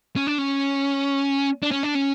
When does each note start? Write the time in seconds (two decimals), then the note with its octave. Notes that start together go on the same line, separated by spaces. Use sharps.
0.16 C#4
0.27 D4
0.38 C#4
1.62 D4
1.71 C#4
1.83 D4
1.95 C#4